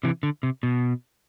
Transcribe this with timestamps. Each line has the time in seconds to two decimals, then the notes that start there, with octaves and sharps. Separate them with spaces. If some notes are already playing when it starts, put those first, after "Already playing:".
0.03 C3 E3
0.23 D3
0.43 C3
0.63 B2